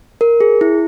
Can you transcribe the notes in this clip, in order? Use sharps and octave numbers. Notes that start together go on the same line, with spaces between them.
A#4
G#4
E4